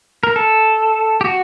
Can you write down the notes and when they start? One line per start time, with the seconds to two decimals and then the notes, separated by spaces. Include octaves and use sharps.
0.23 A#4
0.36 A4
1.21 G4
1.25 F#4